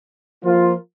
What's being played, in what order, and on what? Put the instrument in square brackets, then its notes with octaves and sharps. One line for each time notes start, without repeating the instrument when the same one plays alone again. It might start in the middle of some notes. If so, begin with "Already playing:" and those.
[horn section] F3 A#3 F4